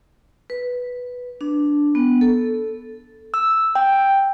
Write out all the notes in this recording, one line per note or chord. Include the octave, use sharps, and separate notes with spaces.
B4
D4
B3
A4
E6
G5